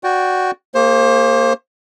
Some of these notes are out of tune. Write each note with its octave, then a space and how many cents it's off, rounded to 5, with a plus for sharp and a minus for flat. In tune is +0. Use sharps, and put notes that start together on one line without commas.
F#4 -5 D5 -10 G5 -10
A#3 -10 G#4 -40 C5 +30